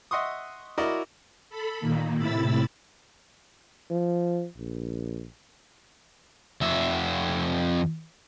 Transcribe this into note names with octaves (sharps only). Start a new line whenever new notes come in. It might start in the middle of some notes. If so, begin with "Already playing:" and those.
D#5 E5 F#5 C6 C#6 D#6
E4 F#4 A#4 D5 D#5
A4 B5
A#2 D#3 A#3
A2 C3 E4 B5 E6 A6
F3
A#1
F2 E5